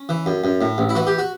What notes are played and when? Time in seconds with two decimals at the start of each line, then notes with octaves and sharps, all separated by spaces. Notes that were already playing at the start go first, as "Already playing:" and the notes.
Already playing: C#4
0.09 E3
0.26 F#2
0.44 F#2
0.61 A2
0.78 A1
0.89 E4
0.95 E3 F#4
1.07 G4
1.18 F#4